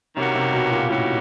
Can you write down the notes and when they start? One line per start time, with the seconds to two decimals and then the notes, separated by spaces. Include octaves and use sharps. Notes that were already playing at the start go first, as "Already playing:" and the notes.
0.16 C3 D#3 G3 A#3 C#4 F#4
0.35 C3
0.52 B2
0.71 A#2
0.88 A2 D#3 G3 A#3 C#4 F#4